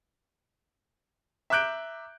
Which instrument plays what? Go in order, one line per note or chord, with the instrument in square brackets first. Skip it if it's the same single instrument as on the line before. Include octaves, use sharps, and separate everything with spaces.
[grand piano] E5 A#5 D6 F#6 G6 D7